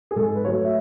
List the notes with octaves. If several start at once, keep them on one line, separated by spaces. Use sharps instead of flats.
G#4
G#2 A4
B4
F#3 A3 C#5
E5